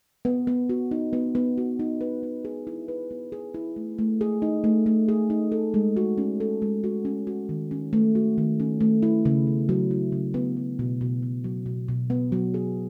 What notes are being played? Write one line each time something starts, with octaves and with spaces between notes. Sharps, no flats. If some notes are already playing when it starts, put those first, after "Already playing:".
B3
B3
F#4
D#4
B3
B3
F#4
D#4
B4
B3
G#4
E4
B4
B3
G#4
E4
A3
A3
G#4
D#4
A3
A3
G#4
D#4
A4
G#3
F#4
C#4
A4
G#3
F#4
C#4
F#4
D#3
C#4
A3
F#4
D#3
C#4
A3
E4
C#3
B3
F#3
E4
C#3
B3
F#3
B2
B2
B3
F#3
B2
B2
B3
F#3
G#4